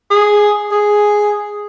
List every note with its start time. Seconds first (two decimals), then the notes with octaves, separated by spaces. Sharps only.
0.10 G#4
0.71 G#4